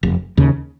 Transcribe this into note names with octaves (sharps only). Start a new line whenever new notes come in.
F1
D#2 C#3